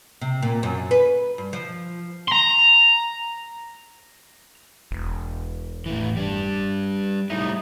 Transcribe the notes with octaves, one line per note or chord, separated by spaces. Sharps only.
C3
A#2
F#2
B4
G2
F3
A#5 C6
E1
A2 E3
G3 D4
G3 A3 D#4 E4